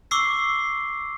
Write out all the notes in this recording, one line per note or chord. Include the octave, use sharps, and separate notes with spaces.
C#6 D6 E6 C7